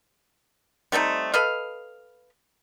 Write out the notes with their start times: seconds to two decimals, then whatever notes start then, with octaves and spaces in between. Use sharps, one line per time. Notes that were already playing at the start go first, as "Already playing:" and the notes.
0.92 G3 A3 C4 D#4
1.34 A4 B4 D#5 F5